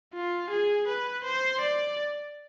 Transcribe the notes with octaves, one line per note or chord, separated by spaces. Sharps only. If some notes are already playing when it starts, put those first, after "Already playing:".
F4
G#4
B4
C5
D5